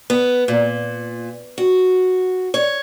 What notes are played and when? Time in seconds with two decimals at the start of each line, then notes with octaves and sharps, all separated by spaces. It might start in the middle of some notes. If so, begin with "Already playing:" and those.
0.10 B3
0.48 A#2
1.58 F#4
2.54 C#5